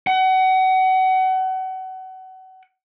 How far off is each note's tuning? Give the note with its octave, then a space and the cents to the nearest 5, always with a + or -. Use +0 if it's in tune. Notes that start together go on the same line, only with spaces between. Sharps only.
F#5 +30